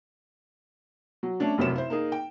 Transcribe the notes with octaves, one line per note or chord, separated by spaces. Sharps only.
F#3
A3 C#4 D4
F1 F#2 C3 E3 C#5 E7
E4 C5
A#3 D#4 G#4
G5